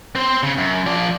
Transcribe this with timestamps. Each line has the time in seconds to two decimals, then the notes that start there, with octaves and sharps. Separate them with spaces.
0.15 C4 C5
0.43 C#3
0.57 F#2
0.86 F3 D5